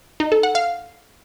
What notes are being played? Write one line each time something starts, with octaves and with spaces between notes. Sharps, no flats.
D#4
A4
F#5
F5